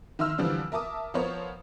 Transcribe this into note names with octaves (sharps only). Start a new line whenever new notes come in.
D#3 D#4 E5 C6 E6 F6
D3 E3 F3 G3 C4 D4
A#4 E5 A5 D6 D#6
F3 B3 A#4 C5 C#5